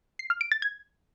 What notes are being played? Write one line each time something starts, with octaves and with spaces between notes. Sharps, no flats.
C7
F6
D7
A6
G#6